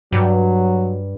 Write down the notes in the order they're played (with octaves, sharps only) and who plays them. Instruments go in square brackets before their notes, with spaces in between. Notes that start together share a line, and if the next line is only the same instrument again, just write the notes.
[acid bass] G2 [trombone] F#3